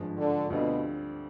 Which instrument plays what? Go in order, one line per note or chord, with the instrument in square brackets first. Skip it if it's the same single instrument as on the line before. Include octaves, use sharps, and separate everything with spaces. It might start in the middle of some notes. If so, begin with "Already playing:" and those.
Already playing: [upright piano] G#1 G2 F3 G#3
[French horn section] D3
[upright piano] D2 D3 G3 C4 F4 [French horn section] B2